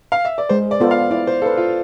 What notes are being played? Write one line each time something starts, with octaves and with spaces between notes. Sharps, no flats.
F5
E5
D5
G#3 C5
D5
B3 F4 A4
F5
E4 D5
C5
A4 B4 F5
F4